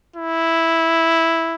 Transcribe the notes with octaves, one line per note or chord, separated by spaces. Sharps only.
E4